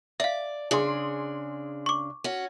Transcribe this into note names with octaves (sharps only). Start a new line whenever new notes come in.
D5 E5 F5
C#3 D4 G#4 C6
C#6 D6
C#4 F#4